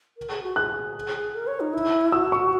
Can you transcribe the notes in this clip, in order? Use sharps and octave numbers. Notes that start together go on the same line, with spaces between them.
A#4
G#4
F#4
G#4 F#6
A#4
C#5
D#4
E4
F#4 E6
C#6